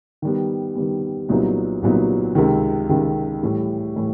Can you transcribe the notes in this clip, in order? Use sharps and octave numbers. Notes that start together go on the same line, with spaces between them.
D#3 G3 B3
D#3 G3 B3
C2 A#2 F#3 B3 D#4
C2 A#2 F#3 B3 D#4
C#2 C3 D#3
C#2 C3 D#3
A2 E3 G3
A2 E3 G3